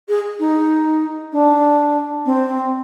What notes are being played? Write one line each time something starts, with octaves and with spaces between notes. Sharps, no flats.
G#4
D#4
D4
C4